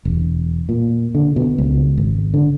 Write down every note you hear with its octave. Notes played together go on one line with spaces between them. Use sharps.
E1
A#2
D3
B2
C#2
G#1
D3